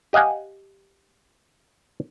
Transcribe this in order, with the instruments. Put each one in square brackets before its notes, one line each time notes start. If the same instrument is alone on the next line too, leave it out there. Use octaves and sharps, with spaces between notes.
[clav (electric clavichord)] G4 D#5 F5 F#5 G#5